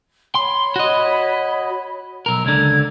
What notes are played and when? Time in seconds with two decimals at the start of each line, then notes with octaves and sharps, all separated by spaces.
0.35 C#5 B5 C6
0.76 F#4 D#5
2.26 B1 A#4 E6
2.45 C#2 D3 G#6